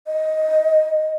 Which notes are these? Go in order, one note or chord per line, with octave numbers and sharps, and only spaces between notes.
D#5